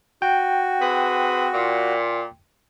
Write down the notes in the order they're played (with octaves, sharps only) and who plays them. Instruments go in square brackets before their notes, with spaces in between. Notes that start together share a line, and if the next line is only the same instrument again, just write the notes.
[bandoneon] F#4 [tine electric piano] G5
[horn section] C4 G#4 B4
A#2